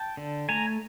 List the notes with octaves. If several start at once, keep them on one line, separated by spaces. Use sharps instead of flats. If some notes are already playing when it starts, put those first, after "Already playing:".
Already playing: G5 A5
D3
A3 G#5 A#5